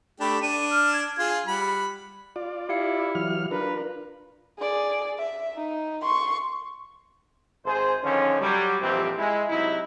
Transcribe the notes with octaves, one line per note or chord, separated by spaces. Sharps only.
A3 D4 G4 B5
D4 D#7
F6
G#6
F4 G#4
G3 F#5 B5
F4 D5
E4 G4 F5 C#7
E3 F#3 F6
D4 F4 A#4 B4
G#4 D5
E5
D#4
C6 C#6
G#1 G#4 C5
D3 D#3 F3 C#4
F#3 G3
A#1 F2 E3 C4 G4
G#3 E4
C3 F#3 D#4 E4